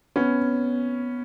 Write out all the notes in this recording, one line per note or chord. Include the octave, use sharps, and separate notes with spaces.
B3 C#4